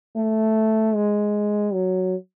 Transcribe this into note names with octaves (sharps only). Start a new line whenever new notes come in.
A3
G#3
F#3